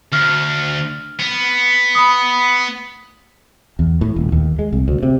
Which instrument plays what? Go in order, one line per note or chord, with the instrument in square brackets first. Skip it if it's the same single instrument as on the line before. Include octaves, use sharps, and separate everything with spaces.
[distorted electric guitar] D2 [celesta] F6
[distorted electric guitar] B3
[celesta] B5 D#6
[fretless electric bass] E2
A2
D#1
D#2
G#3
C2
D2
C3